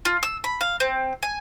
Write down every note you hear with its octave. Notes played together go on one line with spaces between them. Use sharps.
F4
E6
B5
F5
C4
G#5